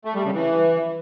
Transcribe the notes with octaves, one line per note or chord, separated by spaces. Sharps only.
A3
G3
C#3
E3